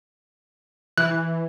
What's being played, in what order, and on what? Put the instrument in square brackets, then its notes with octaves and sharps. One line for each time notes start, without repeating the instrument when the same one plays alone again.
[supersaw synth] E3 [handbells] F#6